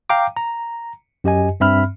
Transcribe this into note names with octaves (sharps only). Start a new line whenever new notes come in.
F5 G5 A#5 D6
A#5
F#2 G4 D#5 G#5
G2 C4 E5 B5 F6